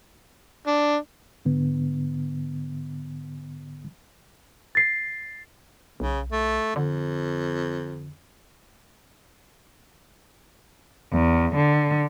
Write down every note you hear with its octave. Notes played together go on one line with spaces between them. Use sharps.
D4
G#2 D3 B3
A6 C7
B1 C#3
A3
F2 D3
E2
D3